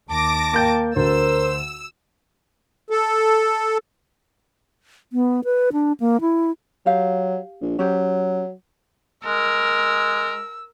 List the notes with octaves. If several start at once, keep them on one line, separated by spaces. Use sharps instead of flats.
D#2 A5 D6 A#6
A#3 G5 G6 A6
D2 A#4 C5 E6
A4
B3
B4
D4
A#3
E4
F#3 G4 F5
A#1
F#3 C#4 G4 C5
G#3 A#4 E6